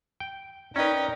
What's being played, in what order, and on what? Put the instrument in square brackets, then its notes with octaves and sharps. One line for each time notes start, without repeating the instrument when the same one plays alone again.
[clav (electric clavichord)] G5
[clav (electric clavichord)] C#4 B4 [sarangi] D#4 [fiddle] A#4 G5 [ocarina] D5